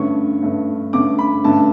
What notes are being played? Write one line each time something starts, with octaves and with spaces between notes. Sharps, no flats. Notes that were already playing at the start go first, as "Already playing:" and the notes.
Already playing: G2 D3 A3 C#4 C#6
G2 D3 A3 C#4
G2 D3 A3 C#4 D6
B5
G2 D3 A3 C#4 A5